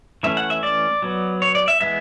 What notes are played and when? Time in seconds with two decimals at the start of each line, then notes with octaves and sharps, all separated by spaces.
0.23 E3 A3 C#4 E5
0.37 F#5
0.50 E5
0.63 D5
1.02 F#3 B3
1.42 C#5
1.55 D5
1.68 E5
1.80 E3 G#3 B3 E5